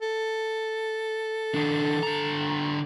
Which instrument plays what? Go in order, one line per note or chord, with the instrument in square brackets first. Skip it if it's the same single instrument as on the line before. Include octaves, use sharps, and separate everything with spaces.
[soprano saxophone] A4
[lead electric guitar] D#3 D4
D3 A#5